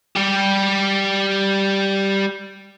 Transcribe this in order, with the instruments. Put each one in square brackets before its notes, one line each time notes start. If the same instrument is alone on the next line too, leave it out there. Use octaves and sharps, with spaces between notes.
[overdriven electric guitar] G3 G4